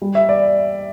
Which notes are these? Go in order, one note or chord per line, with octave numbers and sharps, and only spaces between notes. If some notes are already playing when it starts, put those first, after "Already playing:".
G3
E5
D5